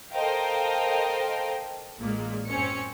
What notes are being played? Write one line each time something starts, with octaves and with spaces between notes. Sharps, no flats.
A4 A#4 C5 D#5 F5 G5
A1 A#2 G#3 A#3
F#2 C4 C#4 C#7